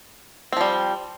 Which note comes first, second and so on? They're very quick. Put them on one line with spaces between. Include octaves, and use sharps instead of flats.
C4 F3 G3